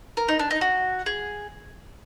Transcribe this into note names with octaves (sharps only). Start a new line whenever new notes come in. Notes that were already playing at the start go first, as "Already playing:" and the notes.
A#4
D#4
D4
D#4
F#4
G#4